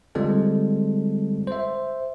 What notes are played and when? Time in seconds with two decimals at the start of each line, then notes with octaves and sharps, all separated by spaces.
0.15 D3 G3 G#3 C4 F4 A4
1.47 C5 E5